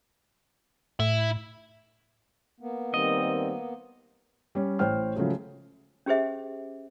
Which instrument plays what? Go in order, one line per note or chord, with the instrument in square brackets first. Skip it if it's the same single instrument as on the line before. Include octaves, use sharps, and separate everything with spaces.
[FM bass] A2 [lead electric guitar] E4
[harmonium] A#3 B3
[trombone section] D#3 G3 C4 [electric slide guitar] D#5
[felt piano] G3 C#4
A1 C5 C#5 G5 F6
C#3 F3 F#3 G#3 A3 G#4
[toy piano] C#4 G4 G#4 C5 E5